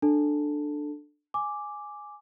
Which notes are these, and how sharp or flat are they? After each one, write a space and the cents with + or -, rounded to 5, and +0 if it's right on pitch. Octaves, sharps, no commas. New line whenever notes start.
D4 +15 A4 +0 A5 +5
G#5 +0 D6 +0